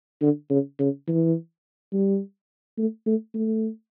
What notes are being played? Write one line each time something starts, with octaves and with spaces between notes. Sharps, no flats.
D3
C#3
C#3
E3
G3
A3
A3
A3